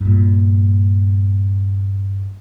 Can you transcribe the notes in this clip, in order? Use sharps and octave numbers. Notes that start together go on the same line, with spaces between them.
G2 A#2